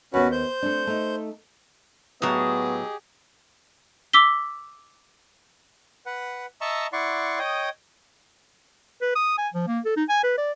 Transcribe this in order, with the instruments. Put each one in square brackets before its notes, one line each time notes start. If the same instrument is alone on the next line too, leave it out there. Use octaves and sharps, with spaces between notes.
[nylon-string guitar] D#2 B3 [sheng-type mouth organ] C#4 F#4 B4
[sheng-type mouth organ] C5 G6
[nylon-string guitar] A3 C4 D4
A3 D#4
[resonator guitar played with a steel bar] A2 F#3 [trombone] B3 [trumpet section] G4 G#4 D#5 [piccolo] D#6
[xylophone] D6 E6 B6 G7
[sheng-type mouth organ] B4 F#5
D#5 E5 A5 A#5 C#6 E6
E4 D5 F#5 C6 C#6
C#5 D#5 G5 D#6
[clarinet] B4
D#6
G#5
F3
A#3
A4
D#4
G#5
B4
D5